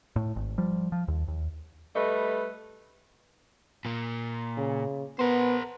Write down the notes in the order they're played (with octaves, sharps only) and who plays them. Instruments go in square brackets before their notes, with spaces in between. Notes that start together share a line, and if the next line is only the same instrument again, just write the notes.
[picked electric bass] A2
G#1
F3 G3
F3
D#2
D#2
[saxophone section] G3 A3 B4 D#5
[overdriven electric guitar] A#2 A#3
[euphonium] C#3
[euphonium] B3 [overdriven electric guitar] A#4 C5